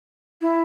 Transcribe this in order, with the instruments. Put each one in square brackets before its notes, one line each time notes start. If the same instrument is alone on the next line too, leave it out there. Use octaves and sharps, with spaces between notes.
[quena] E4